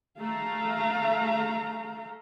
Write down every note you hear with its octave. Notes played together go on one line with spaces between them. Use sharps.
A3 F5 A#5